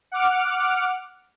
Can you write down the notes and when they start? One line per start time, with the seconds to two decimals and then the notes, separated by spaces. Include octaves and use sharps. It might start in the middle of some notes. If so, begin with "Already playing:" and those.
0.12 F#5 D6 F6